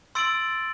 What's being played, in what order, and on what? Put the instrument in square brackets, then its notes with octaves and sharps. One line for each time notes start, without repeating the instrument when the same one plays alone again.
[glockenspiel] C6 E6 A6 D7 F#7